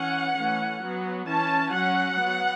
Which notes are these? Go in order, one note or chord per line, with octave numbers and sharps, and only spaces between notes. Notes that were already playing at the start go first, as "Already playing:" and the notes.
Already playing: E3 C#4 F#5
E3 A3 C#4
F#3 B3
E3 C#4 A5
F#3 C#4 F#5
F#3 B3